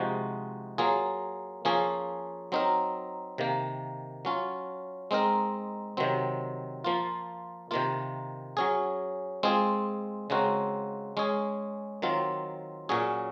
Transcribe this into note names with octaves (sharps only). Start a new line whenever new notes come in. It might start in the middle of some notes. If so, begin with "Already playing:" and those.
Already playing: C3 F3 G#3 D#4 F#4
F#3 A#3 F4 G#4
F3 A#3 C#4 G#4
F#3 C4 D#4 A#4
C3 D#3 A#3
F#3 C#4 F4
G#3 C4 D#4 A#4
C3 D#3 F#3 C4
F3 A#3 F4
C3 D#3 A#3 F4
F#3 C#4 G#4
G#3 C4 F4 G#4
C#3 G#3 C4 F#4 A#4
G#3 C#4 G#4
D#3 F#3 C4 F4
A#2 F#3 C#4 G#4